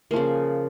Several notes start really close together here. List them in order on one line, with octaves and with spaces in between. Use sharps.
A#3 F3 C#3